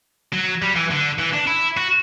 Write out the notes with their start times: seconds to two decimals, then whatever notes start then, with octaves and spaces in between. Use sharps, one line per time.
0.33 F#3
0.62 G3
0.75 E3
0.90 D3
1.18 E3
1.33 D4
1.47 E4
1.77 F#4